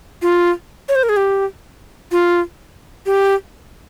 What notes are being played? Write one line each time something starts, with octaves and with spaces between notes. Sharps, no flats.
F4
C#5
C5
A#4
G#4
G4
F4
G4